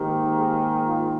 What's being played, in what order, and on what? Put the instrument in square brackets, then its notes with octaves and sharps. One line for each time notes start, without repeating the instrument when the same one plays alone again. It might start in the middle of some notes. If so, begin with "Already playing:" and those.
Already playing: [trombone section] G#2 D#3 A#3 G4
G#4
F4